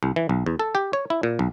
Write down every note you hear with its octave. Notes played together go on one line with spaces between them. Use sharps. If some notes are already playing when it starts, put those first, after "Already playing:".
C2
E3
B1
E2
A4
G4
C#5
E4
A#2
B1